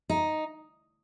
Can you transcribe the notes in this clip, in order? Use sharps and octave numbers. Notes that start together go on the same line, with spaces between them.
D#4